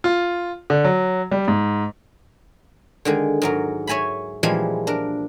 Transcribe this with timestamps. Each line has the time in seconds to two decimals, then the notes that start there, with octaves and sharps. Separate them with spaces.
0.04 F4
0.70 D3
0.84 F#3
1.31 G3
1.48 G#2
3.05 D3 D#3 G#3
3.42 G#2 F#3 A#4
3.87 C#5 E5 G#5 A#5 B5
4.43 A#2 E3 F3 G3 G#3 A#3
4.87 D4 A#4